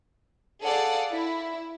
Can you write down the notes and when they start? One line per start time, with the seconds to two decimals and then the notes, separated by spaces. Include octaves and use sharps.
0.63 G#4 A4 D5 F5 F#5
1.13 E4